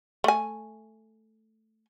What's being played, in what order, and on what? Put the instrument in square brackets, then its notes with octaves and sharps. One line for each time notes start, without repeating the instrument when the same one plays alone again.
[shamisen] A3 G#5